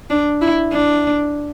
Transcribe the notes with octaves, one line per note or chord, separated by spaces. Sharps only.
D4
E4
D4